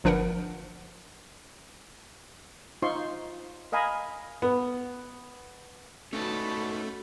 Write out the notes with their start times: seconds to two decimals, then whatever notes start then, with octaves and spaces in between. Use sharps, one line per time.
0.04 G1 F3 D4 A#4 B4 F#5
2.82 D#4 F4 C5 C6 C#6
3.72 A#4 D#5 F5 G#5 A#5 B5
4.42 B3
6.13 A3 C#4 D#4 F#4 B4 A5 B5